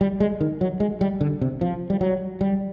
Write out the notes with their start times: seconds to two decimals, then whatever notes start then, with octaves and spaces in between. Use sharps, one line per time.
0.01 G3
0.20 G#3
0.41 D#3
0.61 F#3
0.80 G#3
1.01 G3
1.21 D3
1.41 C3
1.61 F3
1.90 G3
2.01 F#3
2.41 G3